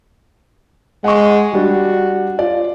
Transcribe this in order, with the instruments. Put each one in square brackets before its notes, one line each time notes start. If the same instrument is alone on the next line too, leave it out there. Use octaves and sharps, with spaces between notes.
[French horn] G#3 [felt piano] F#5 C#6
[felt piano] G3 D4 [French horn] F#4
[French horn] F4 [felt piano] D5